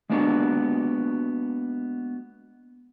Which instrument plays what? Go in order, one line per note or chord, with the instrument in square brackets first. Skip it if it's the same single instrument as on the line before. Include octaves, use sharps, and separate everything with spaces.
[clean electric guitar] G#3 A#3 B3 D4 F#4